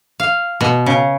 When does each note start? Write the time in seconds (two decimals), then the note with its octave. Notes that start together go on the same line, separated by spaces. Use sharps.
0.20 F5
0.61 B2
0.86 C#3